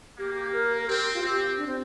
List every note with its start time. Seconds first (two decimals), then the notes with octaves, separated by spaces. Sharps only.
0.18 A#3 G4
0.36 G4
0.53 A#4
0.77 A#4
0.88 C4 G4
1.14 F4
1.23 C4 G4
1.58 D4
1.67 C4